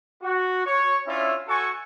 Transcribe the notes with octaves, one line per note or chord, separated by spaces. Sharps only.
F#4
C#5 C#6
C#4 D4 E4 F4 C#5 E5
F#4 A4 G#5 C#6